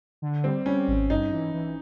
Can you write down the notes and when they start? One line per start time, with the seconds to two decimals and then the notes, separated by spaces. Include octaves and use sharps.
0.22 D3
0.44 G3 C4
0.66 G3 C#4
0.87 G#1
1.09 G2 D#4
1.32 E3
1.54 E3